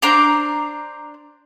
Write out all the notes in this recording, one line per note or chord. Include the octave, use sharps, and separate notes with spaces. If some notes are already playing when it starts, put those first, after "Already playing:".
D4 C5 A#5 D6